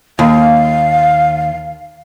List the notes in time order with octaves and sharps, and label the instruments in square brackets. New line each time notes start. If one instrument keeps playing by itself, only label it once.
[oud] D#2 [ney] F5